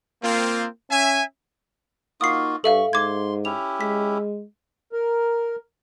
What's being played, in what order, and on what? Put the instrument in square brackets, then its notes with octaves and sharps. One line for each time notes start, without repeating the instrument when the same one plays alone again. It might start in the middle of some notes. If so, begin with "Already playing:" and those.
[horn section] A#3 C4 F4
C#4 E5 G#5
[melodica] A#3 F4 F#4 [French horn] D#4 [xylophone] D#6 C7
[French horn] G2 [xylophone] A4 E5 F5 [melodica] C#6
[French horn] G#2 [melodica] C6 [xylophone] D6 G#6
[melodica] C#4 E4 G4 [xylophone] F7
[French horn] G#3 [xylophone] B6
[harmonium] A#4